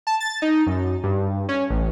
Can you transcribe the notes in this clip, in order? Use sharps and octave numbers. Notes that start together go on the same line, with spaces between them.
A5
A6
D#4
F#2
G2
C#4
A1